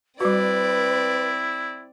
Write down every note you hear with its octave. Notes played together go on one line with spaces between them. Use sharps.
G3 C4 E4 F#4 B4 D5